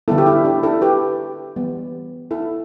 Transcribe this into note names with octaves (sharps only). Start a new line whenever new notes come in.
D3 G3 B3 E4 A4
G4
E4
D4 G4
E4 A4
G4 B4
E3 G3 B3
E4 A4